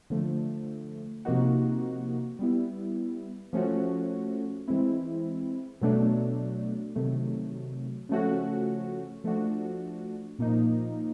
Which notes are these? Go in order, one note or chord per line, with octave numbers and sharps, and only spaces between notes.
D3 F3 A3
C3 F3 A#3 D#4 F#4
G3 B3 E4
F3 A3 C#4 F#4
E3 G#3 C4 E4
B2 F#3 A3 D4
C3 D#3 F#3 A3
C#3 F3 A3 C#4 F#4
F3 A3 D4 F#4
A#2 F3 A#3 D#4